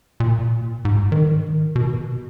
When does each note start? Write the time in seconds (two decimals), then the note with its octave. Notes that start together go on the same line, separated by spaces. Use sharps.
0.20 A#2
0.85 G#2
1.12 D#3
1.76 B2